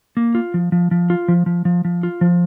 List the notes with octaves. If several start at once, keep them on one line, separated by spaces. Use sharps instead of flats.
A#3
F4
F3
F3
F3
F4
F3
F3
F3
F3
F4
F3